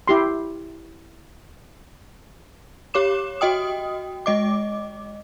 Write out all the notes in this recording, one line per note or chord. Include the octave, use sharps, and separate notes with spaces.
E4 G4 C6
G4 C#5 D6 E7
F#4 D#5 G5 D#6
G#3 D#5 D6